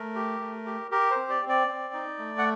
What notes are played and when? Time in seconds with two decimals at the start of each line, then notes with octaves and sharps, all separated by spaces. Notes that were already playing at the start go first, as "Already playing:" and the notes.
Already playing: A3 A#4
0.15 G4
0.40 A3
0.66 G4
0.91 G4 A#4
1.11 C5
1.16 C4
1.30 D5
1.42 C4
1.49 D5
1.67 C4
1.94 D#4
2.18 A3
2.38 F#5